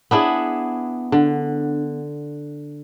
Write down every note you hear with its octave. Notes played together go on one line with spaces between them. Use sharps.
B3 D4 E4 G#4
D3